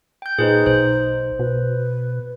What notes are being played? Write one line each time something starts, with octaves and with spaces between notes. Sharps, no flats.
G5 G6
A#2 D#4 G#4 B4 C5
B1 C5
B2 B4